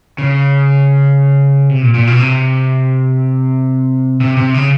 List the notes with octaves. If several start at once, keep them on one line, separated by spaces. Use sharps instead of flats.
C#3
C3
A#2
A#2
B2
C3
C3
C3
C#3